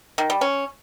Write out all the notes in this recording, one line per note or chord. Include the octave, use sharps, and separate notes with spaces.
D#3
G3
C#4